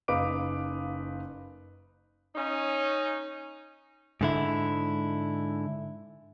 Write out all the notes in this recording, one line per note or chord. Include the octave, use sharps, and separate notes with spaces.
F#1 D#4 B4 F5 D6 D7
C#4 D#4
G#2 D3 E4